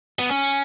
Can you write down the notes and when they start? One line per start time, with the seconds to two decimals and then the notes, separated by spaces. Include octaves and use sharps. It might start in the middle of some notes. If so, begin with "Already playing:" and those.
0.19 B3
0.30 C#4